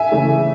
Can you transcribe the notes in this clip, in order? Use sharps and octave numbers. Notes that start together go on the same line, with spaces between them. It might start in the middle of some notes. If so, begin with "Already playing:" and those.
Already playing: E5 G#5
C#3 E3 A3